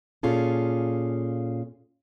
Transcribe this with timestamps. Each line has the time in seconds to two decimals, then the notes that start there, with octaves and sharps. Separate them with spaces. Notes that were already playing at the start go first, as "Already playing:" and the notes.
0.23 A#2 C#4 F4 G#4 A4